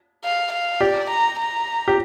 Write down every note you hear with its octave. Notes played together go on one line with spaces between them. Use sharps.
F5
F5
G4 D5
A#5
A#5
G4